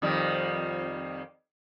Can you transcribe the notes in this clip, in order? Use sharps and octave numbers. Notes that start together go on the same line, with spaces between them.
F2 D#3 G3